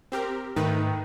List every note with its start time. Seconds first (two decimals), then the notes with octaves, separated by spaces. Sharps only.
0.12 C4 G4 A#4
0.56 G#2 D#3 A3 D#4 B4